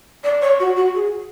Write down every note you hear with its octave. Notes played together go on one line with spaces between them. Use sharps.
D5
C#5
F#4
F#4
G#4